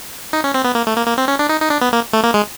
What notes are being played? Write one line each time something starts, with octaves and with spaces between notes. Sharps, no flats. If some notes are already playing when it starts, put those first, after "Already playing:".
D#4
C#4
C4
B3
A#3
A3
A#3
A#3
C4
C#4
D4
D#4
D#4
D4
B3
A#3
A3
A#3
G#3